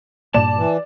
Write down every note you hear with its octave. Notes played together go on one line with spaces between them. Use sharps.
G2 A#2 A#3 D5 A5 E7
E3